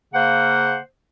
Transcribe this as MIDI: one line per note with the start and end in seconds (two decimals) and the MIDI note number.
0.13 0.77 49
0.13 0.77 58
0.13 0.77 72
0.13 0.77 78